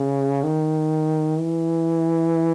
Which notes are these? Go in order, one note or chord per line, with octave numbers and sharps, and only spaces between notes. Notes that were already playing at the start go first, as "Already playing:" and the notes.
Already playing: C#3
D#3
E3